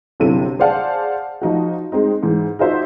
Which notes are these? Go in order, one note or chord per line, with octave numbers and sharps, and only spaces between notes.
G1 C3 F#3 E4 A4 D#7
G#4 C5 D5 F5 F#5 A5
F3 D#4 F#4
G#3 C4 D#4
G#2 E3
D#4 F4 F#4 C5 E5